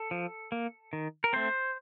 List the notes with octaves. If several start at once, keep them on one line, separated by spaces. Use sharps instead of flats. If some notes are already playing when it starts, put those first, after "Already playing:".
Already playing: A4
F3
A#3
D#3
A#4
A3 C4 C5